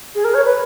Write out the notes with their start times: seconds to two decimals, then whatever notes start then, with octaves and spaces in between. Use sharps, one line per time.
0.15 G#4
0.24 A#4
0.34 C#5
0.45 B4